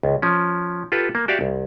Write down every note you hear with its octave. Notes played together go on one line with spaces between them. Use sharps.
C#2
F3 C#4
F4 G4 A4 B4
A#3
F#4 G4 D5 E5 F5
C2